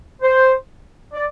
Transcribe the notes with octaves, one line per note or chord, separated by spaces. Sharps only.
C5
D5